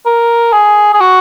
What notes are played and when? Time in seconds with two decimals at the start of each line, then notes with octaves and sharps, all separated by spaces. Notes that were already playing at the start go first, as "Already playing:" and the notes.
0.06 A#4
0.53 G#4
0.93 G#4
1.00 F#4